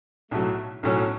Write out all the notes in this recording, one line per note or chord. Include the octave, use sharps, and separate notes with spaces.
B1 A2 F#3 A3
B1 A2 F#3 C#4